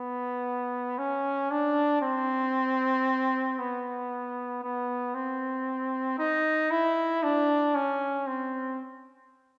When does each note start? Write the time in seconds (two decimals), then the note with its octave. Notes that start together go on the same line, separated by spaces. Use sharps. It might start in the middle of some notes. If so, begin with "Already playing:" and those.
Already playing: B3
0.98 C#4
1.51 D4
2.02 C4
3.58 B3
4.63 B3
5.14 C4
6.19 D#4
6.70 E4
7.23 D4
7.74 C#4
8.27 C4